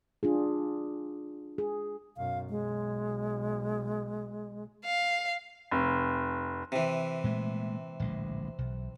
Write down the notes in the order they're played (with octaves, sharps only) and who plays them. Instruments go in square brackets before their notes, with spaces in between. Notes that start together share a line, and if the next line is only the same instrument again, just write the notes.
[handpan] D4 F4 G#4
G#4
[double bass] B1 F#2 [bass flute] F5
[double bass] B1 [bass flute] G#3
[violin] F5
[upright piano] F1
[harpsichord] C3 E3
[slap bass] A#2 G#3 A3
D1 A#1 G#3
B1